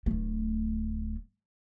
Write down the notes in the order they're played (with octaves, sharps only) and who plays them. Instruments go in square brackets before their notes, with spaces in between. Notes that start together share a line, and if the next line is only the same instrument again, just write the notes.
[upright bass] D1 A3